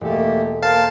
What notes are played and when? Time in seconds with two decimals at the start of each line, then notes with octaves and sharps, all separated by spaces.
0.01 E1 A3 A#3 G4 A4
0.62 A#3 A#4 C5 F5 A5